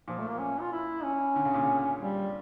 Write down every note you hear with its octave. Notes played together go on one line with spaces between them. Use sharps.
A#2 F3
A3
A#3
C#4
F4
E4
C#4
D3
C#3
A#2
C#3
G3